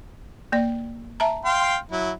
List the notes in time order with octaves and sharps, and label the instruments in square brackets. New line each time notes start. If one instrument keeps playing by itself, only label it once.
[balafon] A#3 D5
E5 A5 A#5
[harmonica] F5 G5 C6
F#3 E4